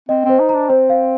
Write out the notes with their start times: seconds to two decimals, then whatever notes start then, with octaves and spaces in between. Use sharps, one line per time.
0.09 C4 D#5
0.25 C4 C5
0.39 D#4
0.49 D4 A#5
0.69 C4 C5
0.90 F5